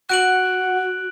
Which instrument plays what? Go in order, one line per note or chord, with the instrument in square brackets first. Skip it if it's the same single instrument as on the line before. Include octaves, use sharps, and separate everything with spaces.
[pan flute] F#4 [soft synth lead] F#5 [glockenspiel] F#6 D7 F#7